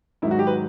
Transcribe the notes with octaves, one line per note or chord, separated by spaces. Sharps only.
G#2 D#3 F#3 E4
F#4
G4
B4